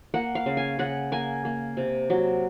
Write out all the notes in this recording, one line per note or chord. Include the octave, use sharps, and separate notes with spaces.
A#3 F#5
F5
C#3
G#5
C#3 F#5
A#3 G#5
A#3
C3
F#3